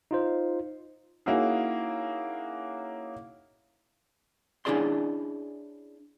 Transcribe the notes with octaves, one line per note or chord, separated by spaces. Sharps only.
D#4 F4 C5
A#3 C#4 D#4 E4 F#4 G#4
C#4 D4 E4 G#4 D5 C6